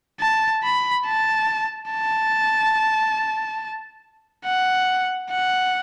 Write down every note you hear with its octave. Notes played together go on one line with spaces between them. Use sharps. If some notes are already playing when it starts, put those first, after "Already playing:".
A5
B5
A5
A5
F#5
F#5